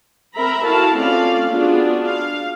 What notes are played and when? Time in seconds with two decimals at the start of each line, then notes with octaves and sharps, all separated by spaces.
0.35 C4 A#4 E5 A#5 B5
0.65 E4 F#4 A4 F5 A5
0.97 A3 C4 C#4 F4 D5 F5
1.49 B3 D4 F4 F#4 G#4
2.05 F5